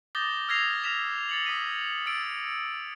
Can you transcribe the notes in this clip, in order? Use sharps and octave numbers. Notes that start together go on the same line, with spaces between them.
D6 D#6 G6 A6 A#6 G7
E6 F6 G#6 A#6 C7 F7
D#6 F6 A#6 B6 E7 F7
A6 C#7 F#7
D#6 B6 D#7
E6 A6 D7